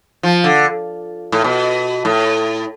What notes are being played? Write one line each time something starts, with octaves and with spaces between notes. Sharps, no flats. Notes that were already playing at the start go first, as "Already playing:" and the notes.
F3
D3
A2
B2
A2